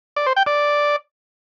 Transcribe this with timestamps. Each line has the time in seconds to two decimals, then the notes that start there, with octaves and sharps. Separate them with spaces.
0.16 D5
0.26 C5
0.36 G5
0.46 D5